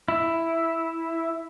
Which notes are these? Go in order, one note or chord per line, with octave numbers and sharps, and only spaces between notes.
E4